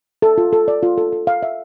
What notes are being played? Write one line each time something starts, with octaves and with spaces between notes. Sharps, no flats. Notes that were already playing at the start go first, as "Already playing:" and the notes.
A4
F4
A4
D5
F4
A4
A4
F5
E5